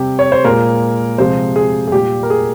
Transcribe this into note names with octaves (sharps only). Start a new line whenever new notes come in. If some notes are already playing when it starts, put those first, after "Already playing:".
Already playing: C3 G3 G4
C#5
C5
A#2 G#3 A#4
C3 F3 G#3 C5
G#4
G#4
A#2 G3 G4
A#4
G#4